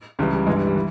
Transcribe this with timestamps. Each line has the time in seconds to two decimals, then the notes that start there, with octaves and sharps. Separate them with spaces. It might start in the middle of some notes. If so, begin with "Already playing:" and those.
0.19 C#2 C#3 E3 G3
0.33 G3
0.47 G1 G2 E3 G#3
0.56 G3
0.67 G3
0.75 E3